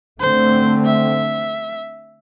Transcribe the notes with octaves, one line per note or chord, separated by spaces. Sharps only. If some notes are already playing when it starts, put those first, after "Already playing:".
D3 A3 C4 C5
E5